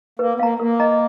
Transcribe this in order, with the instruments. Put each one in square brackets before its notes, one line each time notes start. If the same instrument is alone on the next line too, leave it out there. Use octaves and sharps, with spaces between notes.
[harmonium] A#3 [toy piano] B4
[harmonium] B3
[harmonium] A#3 [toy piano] F5 A#5
[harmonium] A#3 [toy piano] A#4
[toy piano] D#5 A#5